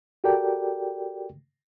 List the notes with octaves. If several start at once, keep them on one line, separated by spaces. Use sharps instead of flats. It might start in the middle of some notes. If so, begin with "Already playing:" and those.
F#4 G4 A4 A#4 D5 G5